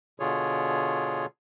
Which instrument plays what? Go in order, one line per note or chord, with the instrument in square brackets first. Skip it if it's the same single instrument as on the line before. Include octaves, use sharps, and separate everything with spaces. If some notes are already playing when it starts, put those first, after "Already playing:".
[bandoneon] B2 D3 F4 G#4 C#5